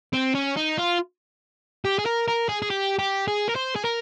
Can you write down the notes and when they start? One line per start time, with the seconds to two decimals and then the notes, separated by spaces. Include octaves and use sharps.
0.13 C4
0.35 C#4
0.56 D#4
0.78 F4
1.85 G4
1.99 G#4
2.06 A#4
2.28 A#4
2.49 G#4
2.62 G#4
2.70 G4
2.99 G4
3.28 G#4
3.49 A#4
3.55 C5
3.75 G#4
3.84 A#4